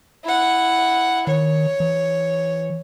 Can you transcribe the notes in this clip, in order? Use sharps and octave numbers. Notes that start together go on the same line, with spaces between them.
E4 F#5
D#3 C#5
E3